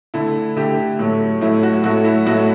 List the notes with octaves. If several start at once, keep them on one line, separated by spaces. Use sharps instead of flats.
D3 A3 E4
D3 A3 G4
A2 F#3 A3
A2 F#3 A3 E4
F#4
A2 F#3 A3 F#4
E4
A2 F#3 A3 F#4